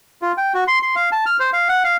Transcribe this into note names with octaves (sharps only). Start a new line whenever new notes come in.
F4
G5
F#4
C6
C6
F5
A5
F6
C5
F5
F#5
F5